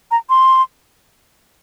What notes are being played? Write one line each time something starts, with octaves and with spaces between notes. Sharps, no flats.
A#5
C6